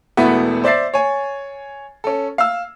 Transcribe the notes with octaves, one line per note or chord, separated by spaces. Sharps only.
E1 A3 B3 E4 F#4
C5 D5 E5 A6 C7
C#5 G#5
C#4 A4
F5 E6